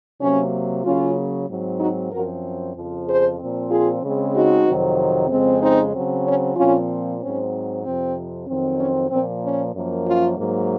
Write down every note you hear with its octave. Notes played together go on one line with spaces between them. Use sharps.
C3 F#3 A#3 C#4
C#3 F#3 A#3 C#4 F4
G#2 F#3 C4
D#4 F#4
F#2 F3 C4 F#4 A#4
F2 C#3 F3
G#4 C5
A#2 F3 C4
F4 G#4
C#3 G#3 C4
D#4 F#4
F2 C3 D#3 F#3 C4
F2 C#3 G#3 C4
C4 D#4
C#3 F#3 C4
C#4
A#2 F3 C4 C#4 F4
G#2 F#3 C4 C#4
F2 C3 F3 C4
F2 D#3 F#3 C4
C#4
A#2 F3 A#3 C4
C#4
F#2 F3 A#3
C#4 F4
G#2 F#3 A#3